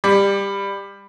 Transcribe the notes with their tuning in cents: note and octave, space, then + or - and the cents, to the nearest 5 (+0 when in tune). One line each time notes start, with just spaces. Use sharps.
G3 +20 D6 +0